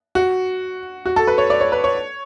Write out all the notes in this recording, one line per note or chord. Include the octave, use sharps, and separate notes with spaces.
F#4
F#4
A4
B4
C#5
D5
C#5
B4
C#5